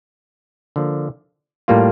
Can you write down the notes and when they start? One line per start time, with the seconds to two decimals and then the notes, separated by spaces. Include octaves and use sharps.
0.76 D3 F3 A#3
1.68 A2 G3 A#3 F4